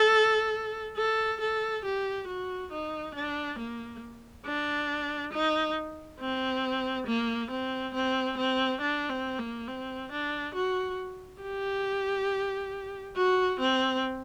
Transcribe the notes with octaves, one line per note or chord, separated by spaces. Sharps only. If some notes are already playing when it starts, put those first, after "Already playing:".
Already playing: A4
A4
A4
G4
F#4
D#4
D4
A#3
D4
D#4
C4
A#3
C4
C4
C4
D4
C4
A#3
C4
D4
F#4
G4
F#4
C4